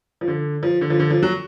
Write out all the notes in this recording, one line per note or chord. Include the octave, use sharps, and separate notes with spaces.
F3
D3
F3
D3
F3
D3
F3
F#3